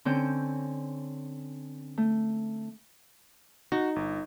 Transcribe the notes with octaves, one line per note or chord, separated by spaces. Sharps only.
D3 C4 C#4 G6
A3
D#4 F#4
G1